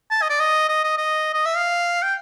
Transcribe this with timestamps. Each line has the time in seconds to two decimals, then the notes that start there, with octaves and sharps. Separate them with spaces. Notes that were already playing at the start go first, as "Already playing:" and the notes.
0.11 A5
0.22 D#5
0.30 D5
0.40 D#5
0.69 D#5
0.84 D#5
0.98 D#5
1.34 D#5
1.45 E5
1.56 F5
2.03 G5